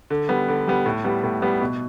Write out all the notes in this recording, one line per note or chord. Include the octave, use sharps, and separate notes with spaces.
D3
G3 B3
D3
G3 B3
A2
G3 B3
A2
G3 B3
B2